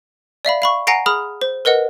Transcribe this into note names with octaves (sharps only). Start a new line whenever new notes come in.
D5 E5 F5 B5
F5 B5 C#6
F#5 G#5 A#5 A#6 C7 D7
G#4 B5 D#6 F6
C5
A#4 B4 D#5 F#5